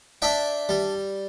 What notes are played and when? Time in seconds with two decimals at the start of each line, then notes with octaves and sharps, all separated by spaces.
0.22 D4 E5 G5
0.69 G3